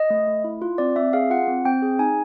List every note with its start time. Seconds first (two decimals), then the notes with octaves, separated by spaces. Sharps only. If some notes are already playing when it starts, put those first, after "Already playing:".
Already playing: D#5
0.10 A3
0.27 A3
0.44 E4
0.62 F4
0.78 C4 D5
0.96 C4 E5
1.13 G#4 F5
1.30 F4 F#5
1.48 C4
1.65 C4 G5
1.82 G#4
1.99 D#4 G#5